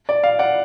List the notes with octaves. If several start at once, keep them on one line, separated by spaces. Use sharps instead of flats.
D5
F5
D5 F#5